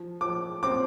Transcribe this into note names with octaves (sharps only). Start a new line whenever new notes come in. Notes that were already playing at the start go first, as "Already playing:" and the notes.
Already playing: F3
F3 D6
C4 D6